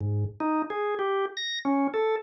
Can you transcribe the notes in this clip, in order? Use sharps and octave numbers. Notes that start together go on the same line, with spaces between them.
G#2
D#4
G#4
G4
A#6
C#4
A4